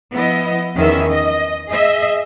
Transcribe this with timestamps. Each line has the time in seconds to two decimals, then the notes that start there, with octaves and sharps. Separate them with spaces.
0.13 F3 B3 E4 D#5
0.75 E2 D#3 C#4 E5
1.10 D#5
1.69 G#4 D#5 E5